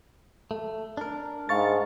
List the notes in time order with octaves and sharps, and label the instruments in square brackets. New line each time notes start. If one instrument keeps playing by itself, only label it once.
[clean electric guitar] A3
D4 A#4
[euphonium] G#2 [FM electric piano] F5 C#6 A6